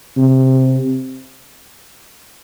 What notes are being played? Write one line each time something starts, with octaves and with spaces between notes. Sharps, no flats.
C3